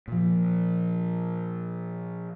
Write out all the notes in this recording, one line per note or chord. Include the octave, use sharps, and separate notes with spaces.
A#2 F3